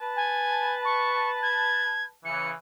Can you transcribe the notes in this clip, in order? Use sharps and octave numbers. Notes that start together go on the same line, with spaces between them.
B4 A5
G#5
C#6
G#6
C#3 E3 C#7